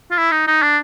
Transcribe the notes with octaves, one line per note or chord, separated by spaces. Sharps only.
F4
E4
D#4
D#4
D4